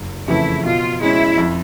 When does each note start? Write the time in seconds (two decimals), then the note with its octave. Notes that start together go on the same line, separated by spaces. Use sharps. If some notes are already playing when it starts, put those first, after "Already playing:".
Already playing: F#1
0.27 F2 C#3 E3 A3 E4
0.64 B2 F4
1.01 G#3 C#4 E4
1.38 F2